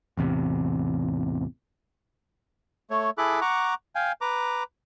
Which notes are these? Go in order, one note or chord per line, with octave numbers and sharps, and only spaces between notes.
A1 E2 C3
A3 C#5
E4 G#4 A4 B5 D6 F#6
F#5 A#5 C#6 D6
F5 G5 G#5
B4 A#5 D6